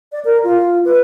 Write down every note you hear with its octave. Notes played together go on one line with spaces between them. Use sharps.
D5
A#4
F4
B4